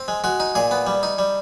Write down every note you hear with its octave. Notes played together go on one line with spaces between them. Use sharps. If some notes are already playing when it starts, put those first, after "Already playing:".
Already playing: C4
G#3
G#3 F#4
D#4
A#2 G#4
B3
G3
D#4
G3